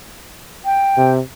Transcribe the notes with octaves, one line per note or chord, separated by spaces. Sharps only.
G5
C3